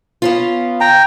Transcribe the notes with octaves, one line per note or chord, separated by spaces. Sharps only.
B3 C#4 F4
G5 A#5